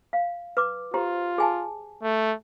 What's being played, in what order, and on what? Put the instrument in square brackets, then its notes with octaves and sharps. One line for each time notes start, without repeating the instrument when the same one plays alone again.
[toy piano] F5
B4 D6
[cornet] F4 [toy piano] G4 C5 A#5
[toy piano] G#4 G#5 A5
[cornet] A3